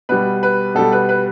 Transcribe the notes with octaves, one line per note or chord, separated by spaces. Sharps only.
B2 G3 B4
B4
B2 G3 A4
B4
B4